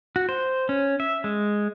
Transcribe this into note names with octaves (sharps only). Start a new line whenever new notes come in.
F#4
C5
C#4
E5
G#3